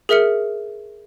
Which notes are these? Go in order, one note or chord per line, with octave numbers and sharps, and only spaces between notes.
G#4 A#4 E5 F6 C#7